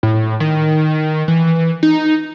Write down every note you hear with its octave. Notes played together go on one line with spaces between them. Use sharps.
A2
D#3
E3
D#4